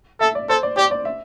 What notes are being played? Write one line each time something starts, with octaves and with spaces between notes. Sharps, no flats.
A4 E5
D5
A4 C5
D5
G4 D5
D5
E5